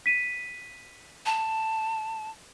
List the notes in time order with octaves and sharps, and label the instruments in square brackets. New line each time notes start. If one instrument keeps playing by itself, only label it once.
[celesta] B6 D#7
[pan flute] A5